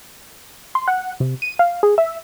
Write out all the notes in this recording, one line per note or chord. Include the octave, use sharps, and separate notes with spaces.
C6
F#5
C3
D#7
F5
G#4
E5